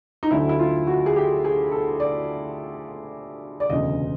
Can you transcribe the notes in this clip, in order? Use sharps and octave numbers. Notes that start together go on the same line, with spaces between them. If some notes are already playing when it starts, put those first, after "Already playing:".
D#4
D2 D3 F#3 A3 E4
E4
F4
F#4
G#4
G4
G#4
A4
D5
D5
E1 D2 C#3 D#5